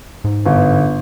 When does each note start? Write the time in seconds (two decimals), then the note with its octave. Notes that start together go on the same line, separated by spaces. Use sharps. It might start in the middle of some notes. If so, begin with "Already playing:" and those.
0.24 G#2
0.46 G1